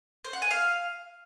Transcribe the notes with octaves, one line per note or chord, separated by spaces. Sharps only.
C5
F#5
G#5
F5